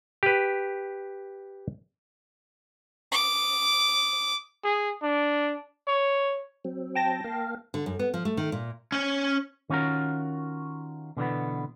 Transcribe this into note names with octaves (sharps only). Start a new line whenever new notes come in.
G4 B4
D6 D#6
G#4
D4
C#5
F#3 C4
G5 A5 A#6
A#3 F5
D3
F#2
B3
F3
A3
D#3
A#2
C#4 C#5
D#3 C#4 F4 F#4 A#4
B2 D3 E3 B3